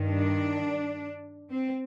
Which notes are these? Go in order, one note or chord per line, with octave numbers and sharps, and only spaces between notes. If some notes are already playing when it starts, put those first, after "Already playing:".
Already playing: G2 D#3
D4
C4